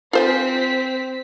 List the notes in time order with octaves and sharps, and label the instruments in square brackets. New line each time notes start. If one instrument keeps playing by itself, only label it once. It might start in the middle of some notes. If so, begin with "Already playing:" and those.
[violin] C4 B6 [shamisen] F4 C5 G#5